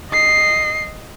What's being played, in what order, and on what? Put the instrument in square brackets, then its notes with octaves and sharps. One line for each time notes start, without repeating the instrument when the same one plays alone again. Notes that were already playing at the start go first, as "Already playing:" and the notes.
[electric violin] D#5 C7